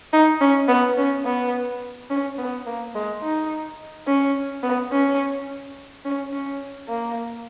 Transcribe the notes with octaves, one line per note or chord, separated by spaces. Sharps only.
D#4
C#4
B3
C#4
B3
C#4
B3
A#3
G#3
D#4
C#4
B3
C#4
C#4
C#4
A#3